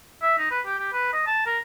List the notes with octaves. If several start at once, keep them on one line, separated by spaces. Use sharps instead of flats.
E5
D#4
B4
G4
G4
B4
D#5
A5
A#4